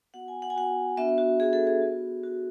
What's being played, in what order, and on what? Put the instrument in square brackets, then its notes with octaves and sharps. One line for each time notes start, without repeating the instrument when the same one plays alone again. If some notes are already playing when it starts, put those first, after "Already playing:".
[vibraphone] B3 F#4 F#5
G#5
F#5
G#5
B3 F#4 F#5
B3 D4 F#4 E5
F#4
B3 D4 F#4 G#4
A4
G#4
B3 F#4
B3 F#4